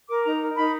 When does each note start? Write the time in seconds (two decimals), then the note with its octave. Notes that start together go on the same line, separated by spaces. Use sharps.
0.08 A#4 D6
0.24 D#4 A#5
0.40 A#4
0.56 D#4 B5